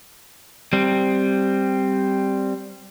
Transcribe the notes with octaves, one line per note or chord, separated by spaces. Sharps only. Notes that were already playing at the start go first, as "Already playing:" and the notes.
G3 C4